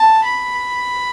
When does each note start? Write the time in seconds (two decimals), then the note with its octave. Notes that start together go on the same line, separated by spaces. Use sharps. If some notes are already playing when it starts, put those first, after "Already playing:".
Already playing: A5
0.24 B5